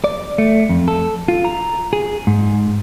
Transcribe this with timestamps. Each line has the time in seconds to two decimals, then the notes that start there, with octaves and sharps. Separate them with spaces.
0.04 D5
0.38 A3
0.69 F2
0.88 A4
1.28 F4
1.45 A#5
1.93 G#4
2.27 G#2